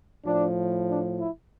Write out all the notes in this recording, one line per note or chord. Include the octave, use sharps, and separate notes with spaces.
A2 F3 D4
D4
E4